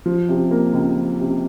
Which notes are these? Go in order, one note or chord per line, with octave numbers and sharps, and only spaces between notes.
F3
C3
A#3
C#2
F3
C3